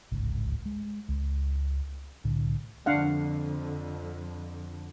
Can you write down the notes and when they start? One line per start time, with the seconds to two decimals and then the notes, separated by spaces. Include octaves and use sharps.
0.12 D1 G#1 C#2
0.66 G#3
1.09 C#2
2.24 C2 A2 D3
2.86 F2 D3 D4 F5 F#5